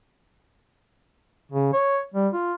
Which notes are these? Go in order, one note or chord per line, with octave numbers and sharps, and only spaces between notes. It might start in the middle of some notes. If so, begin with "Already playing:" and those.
C#3
C#5
G3
F4